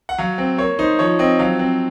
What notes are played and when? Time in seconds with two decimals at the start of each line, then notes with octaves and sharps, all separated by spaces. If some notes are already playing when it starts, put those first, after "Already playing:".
0.09 F#5
0.18 F#3 F5
0.38 C4
0.58 A#3 C#5
0.79 D#4 C5
0.99 F3 C#5
1.19 C4 D#5
1.39 F#3 F5
1.59 C4